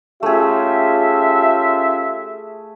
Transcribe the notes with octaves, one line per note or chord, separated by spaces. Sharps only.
A3 C#4 F4 G4 G#4 E5